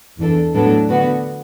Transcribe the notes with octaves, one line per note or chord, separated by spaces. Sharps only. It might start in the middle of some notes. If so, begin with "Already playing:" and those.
E2 E3 D4 A4
A2 F#3 B3 D4 A4
D3 B3 F#4 B4